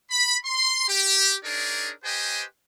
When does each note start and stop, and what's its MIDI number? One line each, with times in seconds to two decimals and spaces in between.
0.11 0.36 83
0.45 0.88 84
0.88 1.35 67
1.44 1.92 62
1.44 1.92 63
1.44 1.92 68
1.44 1.92 70
1.44 1.92 73
1.44 1.92 74
2.04 2.44 67
2.04 2.44 71
2.04 2.44 72
2.04 2.44 75
2.04 2.44 79
2.04 2.44 80